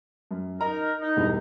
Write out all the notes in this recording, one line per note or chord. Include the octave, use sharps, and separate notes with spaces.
F#2
D#4 A#4 A#5
D#4
E1 G2 E4